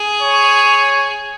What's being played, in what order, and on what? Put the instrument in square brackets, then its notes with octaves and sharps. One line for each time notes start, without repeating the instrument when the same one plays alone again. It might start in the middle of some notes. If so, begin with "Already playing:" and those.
Already playing: [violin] G#4
[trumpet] C#5